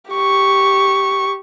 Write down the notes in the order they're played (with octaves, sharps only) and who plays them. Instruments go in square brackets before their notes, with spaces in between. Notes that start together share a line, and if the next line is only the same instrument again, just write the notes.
[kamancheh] G4 C#6